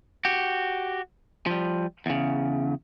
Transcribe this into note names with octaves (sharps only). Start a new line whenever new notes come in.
F#4 G4
F3 G3
E2 C#3